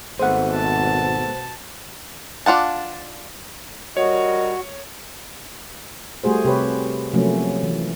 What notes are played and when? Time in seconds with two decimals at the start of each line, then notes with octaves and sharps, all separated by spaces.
0.19 G#1 G#3 A3 B3 C5 F#5
0.50 B2 A5
2.46 D4 F4 F#5 A5
3.97 G3 F#4 A#4 C#5 D#5
6.24 G3 A3 F#4 G#4 C5
6.45 C3 G4 B4 C#5
7.13 C3 F3 F#3 A3 A#3 C#4
7.63 E3